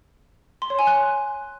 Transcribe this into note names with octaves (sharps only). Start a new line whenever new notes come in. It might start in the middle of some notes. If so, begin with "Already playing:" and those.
C6
C#5
G#5
F#6